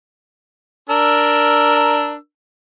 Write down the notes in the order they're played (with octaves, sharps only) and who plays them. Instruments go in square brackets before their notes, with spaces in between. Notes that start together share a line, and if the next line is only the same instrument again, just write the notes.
[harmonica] D4 A#4 E6